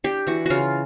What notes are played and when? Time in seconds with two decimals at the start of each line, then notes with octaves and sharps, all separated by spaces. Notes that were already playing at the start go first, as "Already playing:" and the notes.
0.04 D4 G4
0.27 E3 F#4
0.46 C#3 F4 F#4